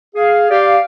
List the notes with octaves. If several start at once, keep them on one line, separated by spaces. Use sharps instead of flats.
G#4 F5
G4 D5 F5